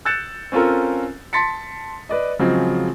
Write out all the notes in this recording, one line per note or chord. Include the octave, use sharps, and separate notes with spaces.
E6 F#6 G6 A6 C#7 E7
C4 C#4 F4 A4 A#4
A5 C6 A6 B6 C#7
B4 D5 D#5
C#3 F3 F#3 G#3 C4